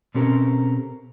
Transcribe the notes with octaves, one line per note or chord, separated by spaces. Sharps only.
B2 C4 C#4 G4 A4 A#4